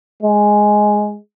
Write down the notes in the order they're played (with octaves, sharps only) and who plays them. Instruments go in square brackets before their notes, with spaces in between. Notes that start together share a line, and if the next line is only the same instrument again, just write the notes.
[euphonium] G#3